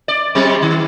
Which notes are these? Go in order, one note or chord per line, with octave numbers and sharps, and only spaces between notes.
D5
F#3 G#3 C4
D#3